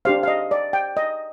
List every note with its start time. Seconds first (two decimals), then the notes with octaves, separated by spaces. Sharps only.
0.05 D4 G4 C5 F5
0.23 F5
0.28 D#5
0.51 D5
0.73 G5
0.97 D#5